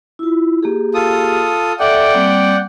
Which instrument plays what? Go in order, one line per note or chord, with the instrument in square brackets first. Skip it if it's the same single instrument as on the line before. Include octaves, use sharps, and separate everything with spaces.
[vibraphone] E4 F4
A#3 G4 G#4
[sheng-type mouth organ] F4 A4 D#6
[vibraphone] A4 E5 [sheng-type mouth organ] D5 F#5 G5
[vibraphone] G3 A#3 C4